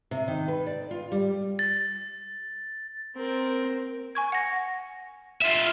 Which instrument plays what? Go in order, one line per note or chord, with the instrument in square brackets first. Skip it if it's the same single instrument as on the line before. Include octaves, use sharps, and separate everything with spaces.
[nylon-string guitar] C3
D#3
B4
D5
F4
G3
[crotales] A6
[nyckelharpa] C4 A#4
[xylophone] G#5 C#6 G#6
F#5 A#6
[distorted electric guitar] F4 E5